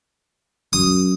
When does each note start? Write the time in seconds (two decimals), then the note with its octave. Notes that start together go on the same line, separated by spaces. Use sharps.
0.73 F#2 D#6